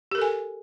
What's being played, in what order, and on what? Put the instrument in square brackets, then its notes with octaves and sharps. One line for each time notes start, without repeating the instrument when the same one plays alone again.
[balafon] G4
A#4
A4
G#5